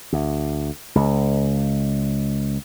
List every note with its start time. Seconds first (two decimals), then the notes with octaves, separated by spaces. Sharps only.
0.13 D2
0.95 C#2